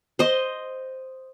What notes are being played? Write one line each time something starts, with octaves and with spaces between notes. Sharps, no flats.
C5 D#5